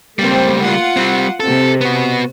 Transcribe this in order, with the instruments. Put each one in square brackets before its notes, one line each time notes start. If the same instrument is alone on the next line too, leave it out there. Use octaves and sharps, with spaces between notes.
[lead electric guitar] C#2 G3 [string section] A3 A#3 C4
[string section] F4 F#5
[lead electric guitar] G3 C4
[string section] C3 C4 [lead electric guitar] A4
[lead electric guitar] B3 F#4